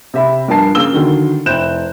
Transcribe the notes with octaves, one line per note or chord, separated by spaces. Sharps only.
C3 E5 B5
G2 F3 A#4 G#5 A5 C7
C#3 A#3 E6 G7
D3 D#3 F#3
F1 C4 E4 F#6 G6 E7